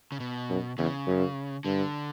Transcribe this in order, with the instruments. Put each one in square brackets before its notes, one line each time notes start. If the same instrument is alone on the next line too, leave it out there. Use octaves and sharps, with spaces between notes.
[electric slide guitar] C#3
B2
[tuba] F#2
[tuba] E2 [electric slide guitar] C#3
[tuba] F#2
[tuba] G2 [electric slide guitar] D3